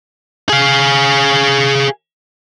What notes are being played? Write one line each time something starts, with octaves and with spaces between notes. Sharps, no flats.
G#4 F5